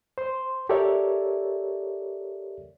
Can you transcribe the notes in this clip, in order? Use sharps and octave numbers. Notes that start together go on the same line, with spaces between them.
C5 C6
G4 A4 A#4 C#5 D5 E5